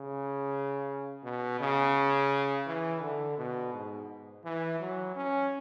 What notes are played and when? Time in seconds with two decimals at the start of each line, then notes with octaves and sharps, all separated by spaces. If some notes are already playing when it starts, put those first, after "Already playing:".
Already playing: C#3
1.24 B2
1.60 C#3
2.67 E3
3.01 D3
3.38 B2
3.73 G#2
4.44 E3
4.80 F#3
5.16 C#4